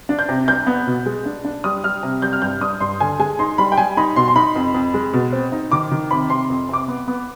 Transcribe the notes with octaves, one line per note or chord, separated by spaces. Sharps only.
D4
G6
C3
C2 G6
B3
B2
G#3
D4
D4
G3 D#6
G3 F6
C3
G3 G6
F6
G2 G6
G2 D#6
G2 C6
D3 G#5
G#3 G#5
D#4 C6
G3 B5
G5
G3 G#5
D#4 B5
B2 C6
C6
D#4 B5
F2
F2
G#3
B2
C4
D#4
D#3 D6
D#3
C3 B5
C3 C6
F2
C3 D6
B3
B3